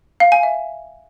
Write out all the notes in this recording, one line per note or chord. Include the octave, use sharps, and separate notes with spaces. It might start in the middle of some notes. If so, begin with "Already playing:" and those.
F5
G#5
E5